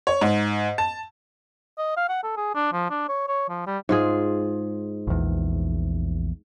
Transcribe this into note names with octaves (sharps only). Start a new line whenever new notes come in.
C#5
G#2
A5
D#5
F5
F#5
A4
G#4
D4
F3
D4
C#5
C#5
F3
G3
G#2 F4 G#4
A#1 E2